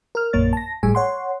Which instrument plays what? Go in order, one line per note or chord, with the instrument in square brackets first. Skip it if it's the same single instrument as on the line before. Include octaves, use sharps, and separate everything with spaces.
[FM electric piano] A#4 F6
A#1 F#2 A#3 C#5 A6
A5 A#6
G#1 A2 G3 G#4 G#5
C#5 F#5 C6